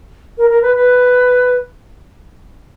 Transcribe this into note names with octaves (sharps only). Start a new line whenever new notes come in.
A#4
A#4
B4
B4